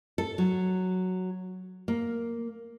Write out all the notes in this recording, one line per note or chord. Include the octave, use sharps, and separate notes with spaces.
A4
F#3
A#3